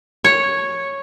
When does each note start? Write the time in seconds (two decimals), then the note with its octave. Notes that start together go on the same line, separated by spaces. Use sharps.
0.24 C#5